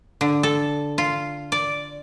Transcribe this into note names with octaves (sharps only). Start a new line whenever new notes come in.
D3
A4
F4
D5